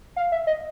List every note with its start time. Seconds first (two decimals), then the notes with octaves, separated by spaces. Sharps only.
0.16 F5
0.32 E5
0.47 D#5